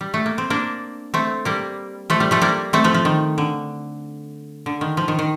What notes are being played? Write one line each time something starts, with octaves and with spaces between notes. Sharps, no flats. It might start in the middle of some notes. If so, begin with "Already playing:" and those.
G3
A3
A#3
C4
A#3 D4
A3 C4
G3 A#3
F3 A3
G3
F3 A3
G3 A#3
A3 C4
F3 A3
F3
D#3
D3
D3
D#3
F3
D#3
D#3